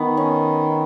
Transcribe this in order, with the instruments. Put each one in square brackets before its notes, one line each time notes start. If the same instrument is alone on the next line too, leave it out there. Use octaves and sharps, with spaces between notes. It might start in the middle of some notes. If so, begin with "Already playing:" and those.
Already playing: [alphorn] D#3 [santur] B3
[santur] C#4